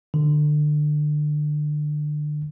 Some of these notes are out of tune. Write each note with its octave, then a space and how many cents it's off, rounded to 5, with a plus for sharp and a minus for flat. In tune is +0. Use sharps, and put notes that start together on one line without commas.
D3 +25